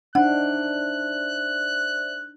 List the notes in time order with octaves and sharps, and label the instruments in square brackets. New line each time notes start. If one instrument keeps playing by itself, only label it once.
[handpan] D4 D#4 [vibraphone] C5 D5 E5 [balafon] F#5 [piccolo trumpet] F#6